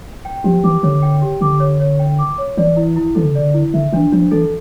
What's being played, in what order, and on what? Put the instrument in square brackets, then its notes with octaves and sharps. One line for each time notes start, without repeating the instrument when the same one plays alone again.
[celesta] G5
[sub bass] F3 [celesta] G4
[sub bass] E3 [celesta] D6
[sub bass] D3 [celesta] C#5
[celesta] G5
G4
[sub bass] D3 [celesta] D6
[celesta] C#5
C#5
G5
D6
C#5
[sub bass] E3 [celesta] D5
[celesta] E4
E4
[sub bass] E3 [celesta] A4
[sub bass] D3
C#3
[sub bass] D3 [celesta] D5
[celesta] E4
[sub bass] D3 [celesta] E5
[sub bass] E3 [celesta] D4
[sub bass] F3 [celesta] D4
[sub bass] E3 [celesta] A4